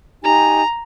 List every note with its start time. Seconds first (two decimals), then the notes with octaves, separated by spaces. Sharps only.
0.24 D#4 G4 G#5 A#5